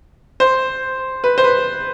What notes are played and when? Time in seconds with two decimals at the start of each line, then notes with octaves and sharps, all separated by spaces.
0.40 C5
1.24 B4
1.38 C5
1.44 B4